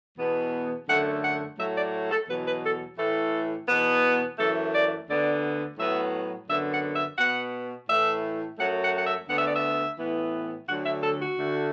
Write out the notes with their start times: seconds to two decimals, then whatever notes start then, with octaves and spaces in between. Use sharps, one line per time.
0.18 E2 B2 B3
0.88 F#2 D3 A3 F#5
1.23 F#5
1.58 A2 F#3 A3 E5
1.75 D5
2.11 A4
2.28 E2 B2 F#3 B4
2.45 B4
2.63 A4
2.98 A2 E3 A3 A4
3.68 E2 B2 B3
4.38 F#2 E3 A3 A4
4.72 D5
5.08 D2 D3 B3 D5
5.78 A2 F#3 B3 E5
6.48 F#2 D3 B3 E5
6.71 F#5
6.95 E5
7.18 B2 B3 F#5
7.88 A2 E3 A3 E5
8.58 F#2 F#3 A3 F#5
8.82 F#5
8.96 F#5
9.05 E5
9.28 D2 D3 B3 F#5
9.37 E5
9.45 D5
9.54 E5
9.98 A2 E3 B3
10.68 D2 D3 F#3 F#5
10.86 E5
11.03 A4
11.20 F#4
11.38 D2 D3 A3